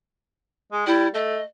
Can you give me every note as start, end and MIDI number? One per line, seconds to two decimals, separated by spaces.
0.72 0.85 56
0.87 1.08 55
0.87 1.08 64
1.14 1.39 57
1.14 1.43 75